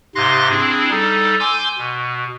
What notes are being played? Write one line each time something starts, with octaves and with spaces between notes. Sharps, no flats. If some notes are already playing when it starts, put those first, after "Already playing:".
G#2 C3 F5 C6 F#6 A#6
C4 D4 E4 G#4
G3 D#4 A4
G#5 C6 D6 E6 G6
B2